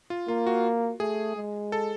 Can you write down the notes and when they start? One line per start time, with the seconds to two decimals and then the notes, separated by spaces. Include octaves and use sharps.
0.10 F4
0.28 A#3 F4
0.47 F#4
1.00 A3 G#4
1.36 G#3
1.72 A4